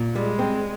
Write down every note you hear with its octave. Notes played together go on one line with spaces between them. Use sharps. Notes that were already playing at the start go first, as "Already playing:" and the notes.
Already playing: A#2
G3 G#3
C4